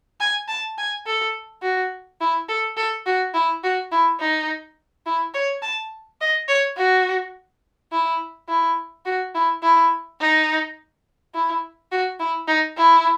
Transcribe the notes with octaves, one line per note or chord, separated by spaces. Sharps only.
G#5
A5
G#5
A4
F#4
E4
A4
A4
F#4
E4
F#4
E4
D#4
E4
C#5
A5
D#5
C#5
F#4
E4
E4
F#4
E4
E4
D#4
E4
F#4
E4
D#4
E4